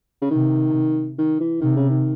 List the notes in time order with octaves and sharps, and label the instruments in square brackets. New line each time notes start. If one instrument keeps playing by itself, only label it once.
[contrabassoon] C#3
[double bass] C3 [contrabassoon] D#3
[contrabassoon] D#3
E3
[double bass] C3 [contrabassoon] D#3
[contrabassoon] C#3
D#3